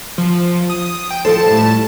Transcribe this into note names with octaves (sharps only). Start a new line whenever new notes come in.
F3
D#6
G5
F3 A4 C5 A5
A2 G3